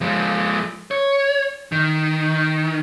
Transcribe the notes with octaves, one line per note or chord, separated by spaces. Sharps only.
F3 G#3
C#5
D#3